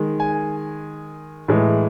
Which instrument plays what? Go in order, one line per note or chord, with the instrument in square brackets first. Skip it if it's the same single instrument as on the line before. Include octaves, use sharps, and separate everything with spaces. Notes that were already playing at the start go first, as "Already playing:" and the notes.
Already playing: [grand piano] D#3 G#3
G#5
A2 E3 G#3